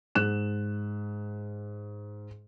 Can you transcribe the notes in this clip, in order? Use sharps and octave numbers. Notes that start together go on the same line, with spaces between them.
G#2 F#6 E7